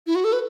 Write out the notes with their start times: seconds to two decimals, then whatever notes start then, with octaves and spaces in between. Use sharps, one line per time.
0.07 E4
0.15 F#4
0.24 A4
0.33 B4